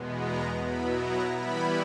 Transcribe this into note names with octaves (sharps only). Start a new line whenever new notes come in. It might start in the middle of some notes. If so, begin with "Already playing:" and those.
Already playing: E2 B2 G#3 B3
A#5
B2 F#3 B3 E4 B5
A#5
E3 G3 B3 E4 B5